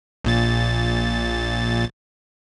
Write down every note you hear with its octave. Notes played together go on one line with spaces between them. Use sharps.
A#1 A#2 A6